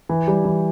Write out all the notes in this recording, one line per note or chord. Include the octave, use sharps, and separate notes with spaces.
E3
G3
E3